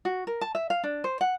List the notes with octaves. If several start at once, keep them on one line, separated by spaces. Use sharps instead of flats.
F#4
A#4
A5
E5
F5
D4
C5
F#5